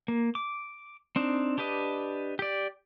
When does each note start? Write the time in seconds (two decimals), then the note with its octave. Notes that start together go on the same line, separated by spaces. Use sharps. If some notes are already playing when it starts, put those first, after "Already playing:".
0.08 A#3
0.35 D6
1.16 C4 D4 D#4
1.58 D4 G4 B4 D#5
2.39 G4 D5